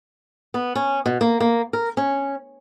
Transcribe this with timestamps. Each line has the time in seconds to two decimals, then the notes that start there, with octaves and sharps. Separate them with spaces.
0.54 B3
0.75 C#4
1.06 B2
1.21 A#3
1.40 A#3
1.73 A#4
1.97 C#4